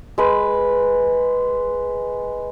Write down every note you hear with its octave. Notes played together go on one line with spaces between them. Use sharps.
G#3 B4